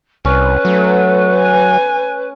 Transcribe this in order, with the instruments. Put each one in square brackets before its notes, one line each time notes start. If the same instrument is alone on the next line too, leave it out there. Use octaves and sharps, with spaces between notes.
[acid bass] C2 [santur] C#4 [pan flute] B4
[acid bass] F#3 [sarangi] A3 [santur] C#4
[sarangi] G#5